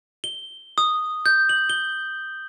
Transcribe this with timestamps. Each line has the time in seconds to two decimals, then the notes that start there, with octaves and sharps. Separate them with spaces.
0.24 G7
0.78 D#6
1.26 G6
1.49 F#7
1.70 G7